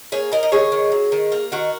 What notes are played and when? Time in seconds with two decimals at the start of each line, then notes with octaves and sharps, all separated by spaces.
0.12 A#3 G#4 C#5
0.32 A#3 A#4 D#5
0.43 D#5
0.52 D#3 G#4 C#5
0.72 D#3
0.92 F#3
1.12 D#3
1.32 A#3
1.52 D#3 F#4 A#4